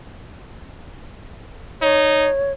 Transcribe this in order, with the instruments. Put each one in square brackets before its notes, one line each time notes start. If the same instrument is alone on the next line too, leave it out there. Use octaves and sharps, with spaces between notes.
[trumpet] D#4 [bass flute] C#5